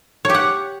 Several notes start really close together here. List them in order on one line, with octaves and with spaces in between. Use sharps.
C#5 G4 F#5